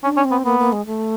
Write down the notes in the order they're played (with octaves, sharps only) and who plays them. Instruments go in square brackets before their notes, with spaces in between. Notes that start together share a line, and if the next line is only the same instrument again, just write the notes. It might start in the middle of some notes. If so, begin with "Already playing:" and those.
[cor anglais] C#4 [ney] D4
[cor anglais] C#4
[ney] C4
[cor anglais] B3
[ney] A#3 [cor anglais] B3
[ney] A#3
G#3
A3